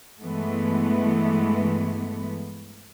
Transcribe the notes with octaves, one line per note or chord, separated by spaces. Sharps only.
G2 E3 G#3 A3 B3